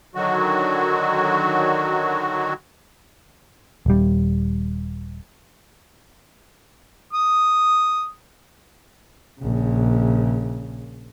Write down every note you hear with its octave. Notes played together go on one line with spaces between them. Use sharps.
D3 D#3 F#3 F#4
D#1 G3
D#6
A#1 C#3